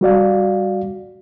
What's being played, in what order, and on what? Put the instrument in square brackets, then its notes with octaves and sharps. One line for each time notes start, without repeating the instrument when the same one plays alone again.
[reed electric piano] G3 F#4 D5 F5